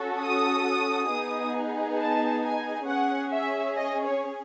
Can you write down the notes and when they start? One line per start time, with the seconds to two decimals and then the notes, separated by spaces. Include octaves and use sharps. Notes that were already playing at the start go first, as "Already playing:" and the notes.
Already playing: C#4 F#4 A4
0.20 D#6
1.09 B3 D#4 G#4
1.98 A5
2.42 G#5
2.86 C#4 G#4 F#5
3.31 E5
3.76 D#5
4.05 C#5